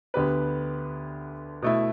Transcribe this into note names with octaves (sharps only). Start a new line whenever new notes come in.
D2 D3 B3 G4 B4
B2 A3 E4